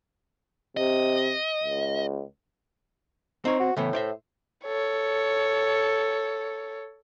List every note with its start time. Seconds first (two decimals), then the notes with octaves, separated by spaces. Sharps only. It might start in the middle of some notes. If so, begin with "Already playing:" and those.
0.77 C3 D#5
1.64 C#2
3.45 C4 D#4 C#5
3.60 F#4
3.77 A2 C#3 E3 B3
3.93 C5 D5 E5
4.65 A4 C#5